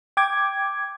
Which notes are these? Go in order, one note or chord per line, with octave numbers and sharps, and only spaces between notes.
G5 D6 G#6